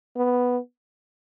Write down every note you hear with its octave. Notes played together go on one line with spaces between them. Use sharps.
B3